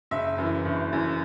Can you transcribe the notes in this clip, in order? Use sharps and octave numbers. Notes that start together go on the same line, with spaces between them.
F#1 E5
F#2 E3
F#1
F#2 E3